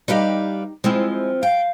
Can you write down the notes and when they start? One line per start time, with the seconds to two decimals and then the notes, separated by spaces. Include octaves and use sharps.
0.08 G3 D#4 G4 B4 F5
0.84 F3 G#3 C4 E4
1.43 F5 G5